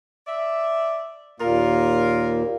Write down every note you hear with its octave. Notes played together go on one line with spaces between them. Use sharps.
D5 E5
D#2 A#2 A#3 F4 A#4